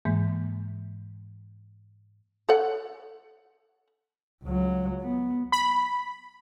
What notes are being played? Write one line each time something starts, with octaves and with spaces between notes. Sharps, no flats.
G#2 E3 G#3 A#3
A4 C#5 F#5
C#2 F#3
B3
B5